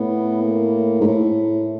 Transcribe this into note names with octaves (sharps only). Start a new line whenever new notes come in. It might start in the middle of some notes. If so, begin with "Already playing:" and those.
Already playing: A2 B3
A#3
G#2
A2 A3